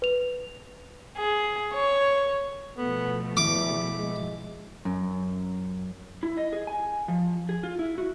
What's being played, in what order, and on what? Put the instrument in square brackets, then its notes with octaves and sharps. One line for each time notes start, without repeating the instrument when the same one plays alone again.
[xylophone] B4 F7
[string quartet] G#4
C#5
[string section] B2 F3 A3 [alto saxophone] B3 [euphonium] A4
[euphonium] E2 [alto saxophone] E4 [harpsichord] D6
[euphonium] G#3
[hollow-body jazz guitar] F#2
[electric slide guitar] E4
D#5
G#4
G#5
F3
G#4
F4
E4
F#4